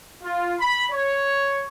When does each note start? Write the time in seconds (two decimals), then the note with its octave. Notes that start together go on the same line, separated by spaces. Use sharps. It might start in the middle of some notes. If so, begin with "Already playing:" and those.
0.22 F4
0.60 B5
0.91 C#5